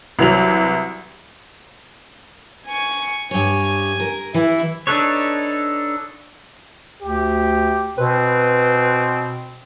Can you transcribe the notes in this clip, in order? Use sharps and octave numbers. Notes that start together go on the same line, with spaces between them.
C2 E3 F#3 F7
G#5 C#6
G2 C#5 G#5
A#4
E3 E4
D4 D#4 A4 B4 C#5
D2 G4
B2 C4 B4